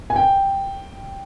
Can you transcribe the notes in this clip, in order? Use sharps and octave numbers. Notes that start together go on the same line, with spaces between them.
G#5
G5